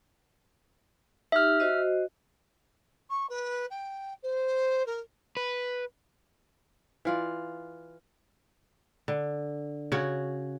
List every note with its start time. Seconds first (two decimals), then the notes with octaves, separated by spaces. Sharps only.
1.32 D#4 G4 E5 F6
1.60 F#4 C5 D#5
3.10 C#6
3.29 B4
3.70 G5
4.22 C5
4.86 A#4
5.37 B4
7.05 E3 F4 D5
9.08 D3
9.92 C#3 F#4 C#5